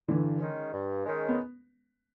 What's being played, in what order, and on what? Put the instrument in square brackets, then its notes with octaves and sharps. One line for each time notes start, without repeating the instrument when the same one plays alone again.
[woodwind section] G2 [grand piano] D3 E3
[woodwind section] D#3 G#3 C#4
G2
D#3 G#3 C#4
[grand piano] B3